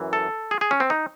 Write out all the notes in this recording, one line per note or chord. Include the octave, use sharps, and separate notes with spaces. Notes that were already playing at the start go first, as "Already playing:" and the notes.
Already playing: F#2 E3
A4
G#4
G#4
C#4
C4
D#4